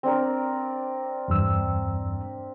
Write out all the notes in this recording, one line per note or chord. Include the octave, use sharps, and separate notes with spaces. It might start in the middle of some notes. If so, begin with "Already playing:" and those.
C4 D4 A#4
E2 G2 E6